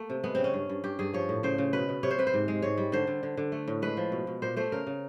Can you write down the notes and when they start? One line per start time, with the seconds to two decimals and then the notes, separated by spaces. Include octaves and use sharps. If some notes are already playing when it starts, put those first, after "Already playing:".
Already playing: A3 A#3
0.10 C3
0.24 G#3 B3
0.35 C#3 C4
0.44 C#4
0.54 G2
0.69 G2
0.84 G2 G4
0.99 G2 G#4
1.13 F3 C#5
1.29 A2
1.43 C#3 C5
1.58 C#3
1.73 B2 B4
1.89 B2
2.03 C3 C#5
2.11 C5
2.18 C3 B4
2.27 C5
2.34 G#2
2.48 G#3
2.62 G#2 C#5
2.77 G3
2.92 D3 C5
3.07 D3
3.23 D3
3.37 D3
3.52 A3
3.68 A2
3.82 G#3 B4
3.97 F3
4.12 B2
4.27 B2
4.42 A#2 C5
4.56 A3 C5
4.72 C#3 A#4
4.87 C#3